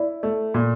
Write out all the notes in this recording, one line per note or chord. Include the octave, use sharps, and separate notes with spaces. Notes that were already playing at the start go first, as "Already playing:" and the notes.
Already playing: E4 D5
A3
A#2